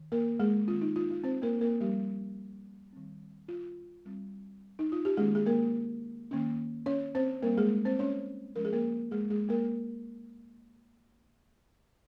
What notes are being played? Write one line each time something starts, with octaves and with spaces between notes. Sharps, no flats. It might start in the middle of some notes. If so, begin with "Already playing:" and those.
Already playing: D#3
A#3 A#4
G#3 G#4
D#3 G#3 C4 F4
D#4
F4
F4
C4 C5
A#3 A#4
A#3 A#4
F3 G3 A#3 C#4 G4
D#3 G3 C4
F4
G3 C4
D#4
F4
G4
D#3 G#3 A#3 C#4 G#4
G#4
A#3 A#4
D#3 A#3 C#4
C#4 C#5
C4 C5
G3 A#3 C4 A#4
G#3 G#4
C4 C5
C#4 C#5
F3 G#3 C#4 A#4
G#4
A#3 A#4
G#3 G#4
G#3 G#4
A#3 A#4